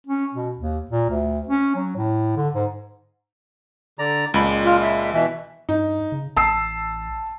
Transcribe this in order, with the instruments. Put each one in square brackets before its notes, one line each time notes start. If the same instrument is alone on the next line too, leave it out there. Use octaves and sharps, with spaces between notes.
[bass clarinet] C#4
B2
D#2
A#2
D2
C#4
F#3
A2
D3
G#2
[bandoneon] D3 D5 A#5
[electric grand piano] C#2 B5 [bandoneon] A#2 G#3
[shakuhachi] F4
E5
[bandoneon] B2 E3 [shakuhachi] E5
[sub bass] G2 [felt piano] D#4
[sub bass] C#3
[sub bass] A1 [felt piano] A5 E6 C7